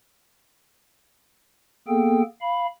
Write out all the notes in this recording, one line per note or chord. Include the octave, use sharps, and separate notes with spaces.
A#3 B3 G#4 A4 G5
F5 B5